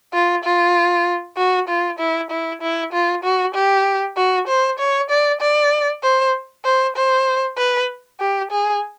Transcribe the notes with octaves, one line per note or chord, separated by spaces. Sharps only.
F4
F4
F#4
F4
E4
E4
E4
F4
F#4
G4
F#4
C5
C#5
D5
D5
C5
C5
C5
B4
G4
G#4